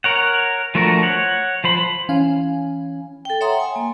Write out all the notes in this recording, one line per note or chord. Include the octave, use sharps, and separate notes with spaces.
A#4 C#5 F#5
F3 A3 D4 F#4 A#4
C#5 F#5
F3 C5 B5
E3 C#4 F5 G#5
A4 G5
C#5 E5 F#5 A#5 C6 D#6
G#5
A#3